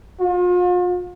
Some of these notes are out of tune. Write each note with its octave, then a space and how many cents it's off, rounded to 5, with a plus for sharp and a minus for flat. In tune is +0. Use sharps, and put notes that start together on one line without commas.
F4 +40